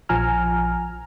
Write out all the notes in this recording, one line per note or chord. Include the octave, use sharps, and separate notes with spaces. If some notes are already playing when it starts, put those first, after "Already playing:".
A#1 F3 G#5 A#5 F6